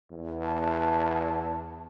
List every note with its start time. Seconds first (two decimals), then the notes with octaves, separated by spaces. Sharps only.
0.11 E2
0.44 A5